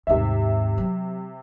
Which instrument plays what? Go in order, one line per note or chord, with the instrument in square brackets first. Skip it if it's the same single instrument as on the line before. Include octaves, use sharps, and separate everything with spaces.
[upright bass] D#2 G#2 [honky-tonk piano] C3 E5
[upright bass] F#3